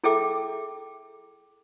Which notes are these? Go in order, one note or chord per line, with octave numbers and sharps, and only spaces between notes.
E4 G#4 A4 E5 G5 D6